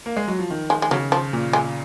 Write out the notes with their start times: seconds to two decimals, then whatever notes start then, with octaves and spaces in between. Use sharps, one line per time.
0.06 A#3
0.17 G#3
0.28 F#3
0.39 F3
0.50 D#3
0.70 G#3
0.82 G#3
0.91 C#3 F#3
1.12 F3
1.33 A#2
1.53 G#3